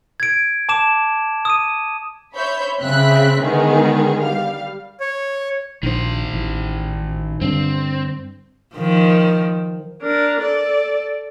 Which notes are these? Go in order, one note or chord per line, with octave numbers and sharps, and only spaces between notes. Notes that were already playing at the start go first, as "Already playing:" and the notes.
G#6 D7
A5 D6 E7
D#6 D#7
C5 C#5 E5 B5 G6
C#3 C4 E5 B5 F#6 B6
D3 D#3 G#3 B3 G#4
G3 F5
C#5
A#1 D#3 C5
A1
G2 D3 C4
D#3 F3
D4 A#4
A4 D5